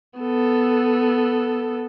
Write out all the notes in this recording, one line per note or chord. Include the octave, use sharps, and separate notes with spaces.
B3 A4